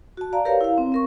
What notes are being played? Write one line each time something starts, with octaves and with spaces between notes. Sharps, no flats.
F#4 A5
D5 F5 A#5
G4 A#4 B4 C#5 F5
E4 F5
C4
C4 A#4 C#6